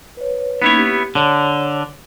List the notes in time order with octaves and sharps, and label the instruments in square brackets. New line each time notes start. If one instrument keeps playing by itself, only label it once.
[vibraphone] B4 C#5
[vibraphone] A#3 C#4 D#4 [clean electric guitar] B3 E4 C#5
[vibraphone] G4
[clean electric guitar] D3 [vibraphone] C#5